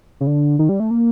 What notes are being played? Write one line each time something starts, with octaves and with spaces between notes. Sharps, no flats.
C#3
D3
D#3
G3
A3
A#3